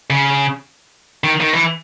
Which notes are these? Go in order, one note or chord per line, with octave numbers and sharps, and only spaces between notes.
C#3
D#3
D#3
E3